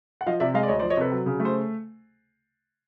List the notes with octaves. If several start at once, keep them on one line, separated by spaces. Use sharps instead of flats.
F#5
F3 D#5 F5
C3 D5 E5
G#3 D#5 F5
D5
D2 C#5 D#5
C5 D5
F3
C#5 D#5
C3 A4 B4
F#3
C#3
A3
C5